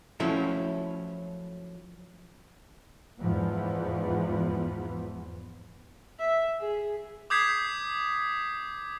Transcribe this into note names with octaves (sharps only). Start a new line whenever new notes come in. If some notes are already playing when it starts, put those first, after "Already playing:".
F3 F#3 A3 C#4 E4
E2 G#2 E3 F3 B3
E5
G#4
D6 D#6 G6 G#6 B6 C7